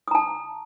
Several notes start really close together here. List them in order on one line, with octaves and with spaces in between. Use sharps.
D#6 A#5 A5